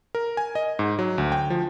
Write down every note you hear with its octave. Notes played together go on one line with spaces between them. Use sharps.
A#4
G#5
D#5
G#2
F#3
D2
G5
F3